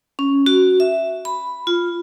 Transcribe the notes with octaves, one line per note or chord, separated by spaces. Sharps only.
C#4
F#4
E5
B5
F4